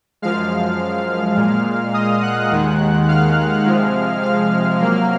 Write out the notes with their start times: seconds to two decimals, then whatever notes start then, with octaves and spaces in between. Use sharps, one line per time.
0.22 F#2 F3 G#3 F5 F6
1.37 A#2 G#3
1.94 D#5 D#6
2.22 F#5 F#6
2.51 D#2 D#3 G#3
3.08 F5 F6
3.66 C3 F3 G#3
4.22 F5 F6
4.80 C3 F#3 A#3